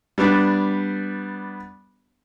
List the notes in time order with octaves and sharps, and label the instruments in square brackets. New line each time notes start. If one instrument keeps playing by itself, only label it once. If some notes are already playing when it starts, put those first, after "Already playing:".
[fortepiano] G3 B3 D4